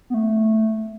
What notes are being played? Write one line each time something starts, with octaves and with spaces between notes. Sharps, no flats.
B3
A3